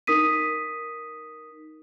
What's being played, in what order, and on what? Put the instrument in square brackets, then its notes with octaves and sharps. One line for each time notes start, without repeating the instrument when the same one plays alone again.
[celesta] D#4 A#4 D#6 B6 D#7